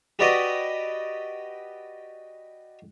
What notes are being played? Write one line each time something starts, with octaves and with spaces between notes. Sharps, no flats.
F#4 G4 B4 D5 D#5